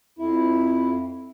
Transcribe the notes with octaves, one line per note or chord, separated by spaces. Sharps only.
F2 E4